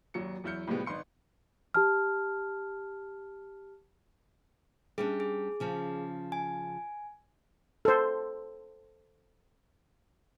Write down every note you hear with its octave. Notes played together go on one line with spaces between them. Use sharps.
G#1 D#2 F#3 C#7
E2 F#3 E4 F6 G6 C#7
A2 C3 F3 G3 G#3 B3
G#1 D#4 B4 C6 C#7
G4 A5 F6
G3 C#4 D4 G#4
G#4
C#3 F3 C#4
G#5
A4 C5